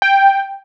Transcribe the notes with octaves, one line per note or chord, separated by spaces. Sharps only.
G5